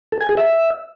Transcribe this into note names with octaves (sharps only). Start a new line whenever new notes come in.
A4
G#5
G#4
E5